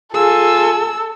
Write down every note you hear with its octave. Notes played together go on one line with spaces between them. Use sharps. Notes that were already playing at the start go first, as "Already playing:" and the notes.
F4 G#4 A4 G#5 E6